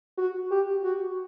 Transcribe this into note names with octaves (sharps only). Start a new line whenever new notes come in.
F#4
G4
F#4